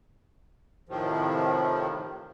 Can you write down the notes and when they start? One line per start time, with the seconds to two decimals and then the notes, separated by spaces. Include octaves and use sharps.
0.89 A2 C3 D#3 F3